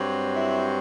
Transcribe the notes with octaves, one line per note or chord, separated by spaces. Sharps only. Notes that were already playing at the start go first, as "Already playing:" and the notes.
Already playing: G2 F#3 C4
E4